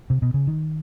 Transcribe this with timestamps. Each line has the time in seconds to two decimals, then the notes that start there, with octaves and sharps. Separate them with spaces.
0.10 C3
0.22 B2
0.34 C#3
0.47 D#3